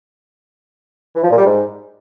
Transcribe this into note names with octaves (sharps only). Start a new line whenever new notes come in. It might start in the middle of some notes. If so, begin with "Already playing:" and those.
E3
F3
A#2
G3
G#2